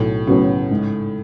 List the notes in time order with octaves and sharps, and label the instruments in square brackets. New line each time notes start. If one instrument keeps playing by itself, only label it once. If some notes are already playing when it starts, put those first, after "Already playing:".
Already playing: [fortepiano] B1 [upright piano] A2
[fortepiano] A2 F#3 B3 F#4 [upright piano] C#3
[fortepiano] G#2